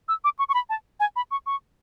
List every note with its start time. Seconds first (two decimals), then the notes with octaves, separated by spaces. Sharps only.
0.08 E6
0.24 D6
0.39 C#6
0.49 C#6
0.54 B5
0.70 A5
1.00 G#5
1.16 B5
1.31 C#6
1.46 C#6